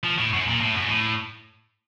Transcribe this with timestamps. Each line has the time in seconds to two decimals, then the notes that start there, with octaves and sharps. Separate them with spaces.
0.04 F3
0.18 A2
0.33 F#2
0.48 A#2
0.60 A2
0.74 F#2
0.87 A2